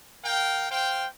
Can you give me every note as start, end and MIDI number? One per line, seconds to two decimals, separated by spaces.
0.24 0.70 70
0.24 0.70 77
0.24 0.70 79
0.70 1.07 72
0.70 1.07 77
0.70 1.07 79